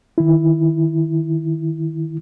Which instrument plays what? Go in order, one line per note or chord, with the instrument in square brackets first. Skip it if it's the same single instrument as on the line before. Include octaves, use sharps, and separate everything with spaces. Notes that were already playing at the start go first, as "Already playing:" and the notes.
[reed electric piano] D#3 E4